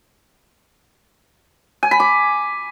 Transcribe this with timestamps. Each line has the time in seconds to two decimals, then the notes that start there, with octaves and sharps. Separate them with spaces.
1.83 G#5
1.91 B5
2.00 D6